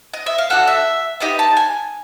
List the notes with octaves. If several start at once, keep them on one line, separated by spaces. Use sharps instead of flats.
D#5
E5
F5
D4 F#4 A4 F#5
E5
B3 D#4 G4 D#5
A5
G#5